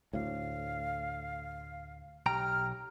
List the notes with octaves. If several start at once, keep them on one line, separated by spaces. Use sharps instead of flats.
D2 A2 F5
B1 G4 G5 A#5 F6